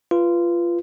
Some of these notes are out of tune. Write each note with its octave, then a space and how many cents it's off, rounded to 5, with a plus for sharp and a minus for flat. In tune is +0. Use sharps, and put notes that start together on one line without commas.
F4 -20 B4 +0